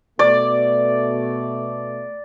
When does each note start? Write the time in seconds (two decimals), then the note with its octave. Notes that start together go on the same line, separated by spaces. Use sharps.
0.19 B2 A3 D5